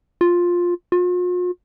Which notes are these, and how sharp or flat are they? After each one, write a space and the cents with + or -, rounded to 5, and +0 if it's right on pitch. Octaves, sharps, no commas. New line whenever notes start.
F4 +10
F4 +45